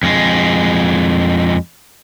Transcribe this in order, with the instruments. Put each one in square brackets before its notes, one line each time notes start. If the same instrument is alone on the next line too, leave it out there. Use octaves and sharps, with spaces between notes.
[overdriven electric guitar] F2 G#3